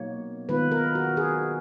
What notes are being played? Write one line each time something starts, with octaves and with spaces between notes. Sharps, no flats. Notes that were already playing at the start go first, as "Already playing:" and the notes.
Already playing: B2 F#3 A#3 D#4 C#5
D#3 G#3 B3 F4 B4
A#4
F#4
G#4